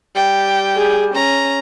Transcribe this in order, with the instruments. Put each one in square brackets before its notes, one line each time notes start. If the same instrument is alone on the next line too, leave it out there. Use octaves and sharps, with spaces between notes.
[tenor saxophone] G3 [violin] G5
[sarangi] G#4
[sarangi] C#4 [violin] A#5